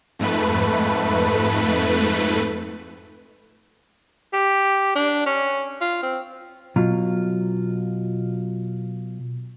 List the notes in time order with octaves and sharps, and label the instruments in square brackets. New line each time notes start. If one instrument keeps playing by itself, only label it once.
[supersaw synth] F2 G#2 A3 B4
[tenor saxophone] G4
D4
C#4
F4
C4
[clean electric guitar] B2 F#3 F4